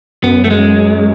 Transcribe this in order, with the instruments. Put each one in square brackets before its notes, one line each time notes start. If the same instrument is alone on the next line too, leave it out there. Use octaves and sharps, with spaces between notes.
[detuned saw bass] F#2 [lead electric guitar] B3
[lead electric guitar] A3
G#3